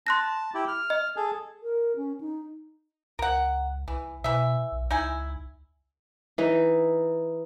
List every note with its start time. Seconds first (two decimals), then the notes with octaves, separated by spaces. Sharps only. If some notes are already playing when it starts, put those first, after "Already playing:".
0.07 A5 C6 F#6 A#6
0.54 E4 G4
0.68 F6
0.90 D#5
1.16 G#4 A4
1.63 A#4
1.96 C#4
2.21 D#4
3.19 C#2 A#4 F#5
3.88 C2 E3
4.24 B2 E3 E5
4.72 B1
4.91 C#2 D#4 E4 G#5
6.38 E3 D#4